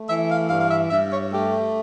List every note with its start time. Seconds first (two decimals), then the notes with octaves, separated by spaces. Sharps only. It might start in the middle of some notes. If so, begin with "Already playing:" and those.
Already playing: A3
0.09 E3 E5
0.30 F5
0.50 G2 F5
0.61 F5
0.70 E5
0.90 G2 E5
1.11 C#5
1.31 A3 G4